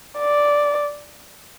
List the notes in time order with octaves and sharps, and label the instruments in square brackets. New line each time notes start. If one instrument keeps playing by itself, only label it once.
[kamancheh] D5